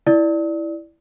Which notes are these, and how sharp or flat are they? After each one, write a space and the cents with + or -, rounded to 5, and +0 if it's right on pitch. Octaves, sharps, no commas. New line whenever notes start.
E4 +0 D5 +0 D#6 +45